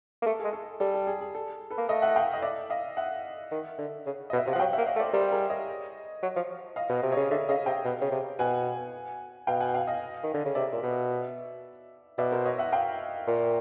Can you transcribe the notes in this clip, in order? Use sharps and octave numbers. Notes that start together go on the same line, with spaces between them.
A#3
A3 A4
G#4
G#3
A4
G3 A4
A4
G#4
G#4
A4
A4 B4
A#3
A3 D#5 F5
E5 F#5
F5 G5
D#5
D5 E5
D#5 F5
E5 F#5
D#3
D3
C#3
D#5
B2
E5
C3 F5
F3 F#5
F#3 F5 G5
E5 F#5
A#3
D#5 F5
A3
C5 D5
G3 A#4 C5
G#4 A#4
C#5 D#5
F#3
F3
D#5 F5
B2
C3
C#3 C#5 D#5
D3 D5 E5
C#3 D#5 F5
C3 F5 G5
B2
C#3
C3
B2 F#5 G#5
B2 F5 G5
F#5 G#5
F5 G5
D#5 F5
D#3
D3
C#3
C3 D5 E5
A#2
B2
B2 D5 E5
A#4 C5
C#5 D#5
E5 F#5
F5 G5
A#2